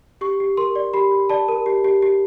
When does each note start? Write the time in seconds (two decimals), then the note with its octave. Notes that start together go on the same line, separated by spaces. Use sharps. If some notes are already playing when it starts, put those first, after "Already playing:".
0.21 G4 C#6
0.40 G4
0.57 A#4 C6
0.76 D5
0.93 G4 B5
1.11 G4
1.29 D5 A5
1.48 A#4
1.66 G4
1.84 G4
2.02 G4